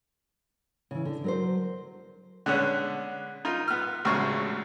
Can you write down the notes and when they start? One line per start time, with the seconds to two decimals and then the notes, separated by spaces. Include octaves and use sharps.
0.91 C#3 E3
1.05 D3
1.24 F#3 A#4 C5
2.46 D3 G#3 B3 C#4
3.45 D#4 F4
3.68 B3 F6
4.05 A1 D2 C#3 G#3 C#6